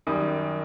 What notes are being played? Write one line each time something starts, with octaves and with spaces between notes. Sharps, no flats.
F#2 D#3 G3 D#6